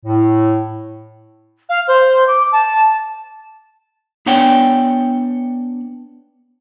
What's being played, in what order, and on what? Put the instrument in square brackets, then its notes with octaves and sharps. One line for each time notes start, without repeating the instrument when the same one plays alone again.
[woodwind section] A2
[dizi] F5
C5
D6
A5
[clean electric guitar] B3 D4 C#5 F#5 G5